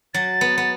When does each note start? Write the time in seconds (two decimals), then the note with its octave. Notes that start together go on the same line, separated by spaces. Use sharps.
0.14 F#3 A6
0.41 B3
0.58 B3